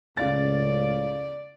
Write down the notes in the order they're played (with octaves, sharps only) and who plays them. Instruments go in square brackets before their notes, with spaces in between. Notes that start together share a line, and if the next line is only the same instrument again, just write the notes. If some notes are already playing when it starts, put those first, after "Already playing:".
[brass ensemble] C#2 A2 [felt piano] C#3 F5 A6 [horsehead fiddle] D5